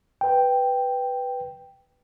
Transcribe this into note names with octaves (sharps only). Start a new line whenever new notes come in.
B4 G5